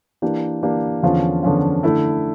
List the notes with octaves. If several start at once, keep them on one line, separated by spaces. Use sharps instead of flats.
E3 A#3 D4 G4
E3 A#3 D4 G4
E2 D3 F3 C#4 F4
E2 D3 F3 C#4 F4
D3 A3 E4 A4